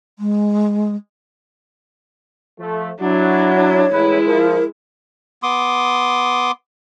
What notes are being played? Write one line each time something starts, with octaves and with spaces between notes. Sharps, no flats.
G#3
F3 A3
F#3 D4 E4 F#4
C#5
A1 G#3 E4 B4
F3 A#4
B3 C6 D6 D#6